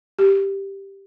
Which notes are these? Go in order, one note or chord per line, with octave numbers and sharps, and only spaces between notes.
G4